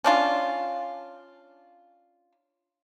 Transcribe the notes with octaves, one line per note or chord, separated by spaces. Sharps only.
C#4 D4 F4